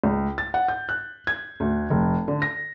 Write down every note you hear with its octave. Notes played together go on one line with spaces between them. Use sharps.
C#2
A6
F#5
G6
F#6
G#6
D2
F1
D3
A#6